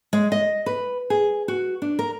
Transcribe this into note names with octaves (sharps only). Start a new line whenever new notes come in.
G#3
D#5
B4
G#4
F#4
D4
A#4